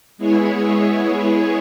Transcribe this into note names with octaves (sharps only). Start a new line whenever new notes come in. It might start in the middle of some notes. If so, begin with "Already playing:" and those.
G#3 B3 E4 G#4 C#5